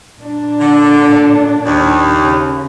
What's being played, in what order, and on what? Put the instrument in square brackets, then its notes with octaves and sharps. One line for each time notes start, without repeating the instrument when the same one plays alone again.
[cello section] A#2 D4
[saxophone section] D3
D#2
[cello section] C#3